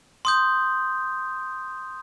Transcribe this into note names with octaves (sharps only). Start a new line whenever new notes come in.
C6 D#6 G6